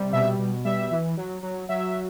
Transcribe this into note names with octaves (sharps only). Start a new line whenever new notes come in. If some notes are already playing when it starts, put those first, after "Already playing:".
Already playing: C3 G3
B2 E5
B2
G3 E5
E3
F#3
F#3
F#3 E5